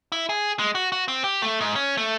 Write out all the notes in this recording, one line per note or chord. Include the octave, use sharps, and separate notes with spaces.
E4
G#4
G#3
F#4
F#4
C4
G4
A3
G#2
C#4
A3